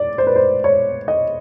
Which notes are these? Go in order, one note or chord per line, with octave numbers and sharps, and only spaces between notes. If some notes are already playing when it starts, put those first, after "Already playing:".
Already playing: D5
C5
B4
C5
C#5
D#5